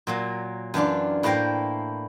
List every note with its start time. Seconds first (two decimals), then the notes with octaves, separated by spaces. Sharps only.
0.07 A#2 F#3 A#3
0.74 F#2 E3 D4 F4
1.23 A2 A#3 E4 C5 G5 A#5